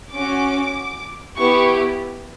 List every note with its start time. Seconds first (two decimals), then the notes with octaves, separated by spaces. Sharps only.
0.13 C#4 F#4 D6
1.36 B3 E4 G4 C#6